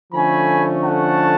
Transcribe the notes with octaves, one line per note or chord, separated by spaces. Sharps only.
D3 F3 A3 C#4 G#5 B5
F#5 A5